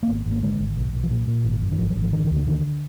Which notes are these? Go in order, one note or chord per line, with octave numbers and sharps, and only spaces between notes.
A#3
G#1 B3
G#1
A#3
D3 G#3
G#1
B1
B1
F3
A#2 F#3
A#2
G#1
F#2
D#3
G#1 F3
F#3
G#1
F3
D3 D#3
D#3
D2
D3
D3 D#3